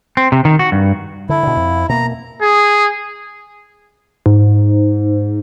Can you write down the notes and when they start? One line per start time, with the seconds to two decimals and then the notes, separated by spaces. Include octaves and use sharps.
0.17 C4
0.32 C3
0.45 D#3
0.59 F#4
0.72 G2
1.29 D3 E4
1.43 B2 D3
1.57 F2
1.89 B2 A#3 A#5
2.42 G#4
4.26 G#2